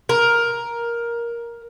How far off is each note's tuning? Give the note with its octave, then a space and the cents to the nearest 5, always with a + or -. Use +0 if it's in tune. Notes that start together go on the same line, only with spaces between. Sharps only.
A#4 +10